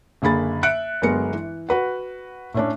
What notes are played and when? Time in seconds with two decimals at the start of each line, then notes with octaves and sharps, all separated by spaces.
0.22 F#1 D3 A#3 G#4 B5 A6
0.63 E5 F#6 C#7 D7
1.02 G1 F#3 G#3 B3 A#4 C#7
1.33 E3
1.69 F#4 B4 F#5
2.54 A2 A3 C#4 D4